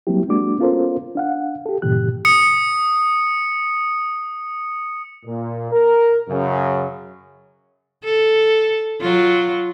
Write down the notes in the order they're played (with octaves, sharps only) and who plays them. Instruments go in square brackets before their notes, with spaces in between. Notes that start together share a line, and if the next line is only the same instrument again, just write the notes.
[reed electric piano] F#3 G3 A#3 C4 E4 G4
G#3 A#3 D4 F#4 D6
B3 C#4 F4 A4 A#4 C5
D4 F5 F#5
G4 A4
G2 A#2 C#3 E3 G4 F#6
[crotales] D#6 C#7
[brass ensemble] A#2
A#4
F#2 C#3
[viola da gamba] A4
F#3 F4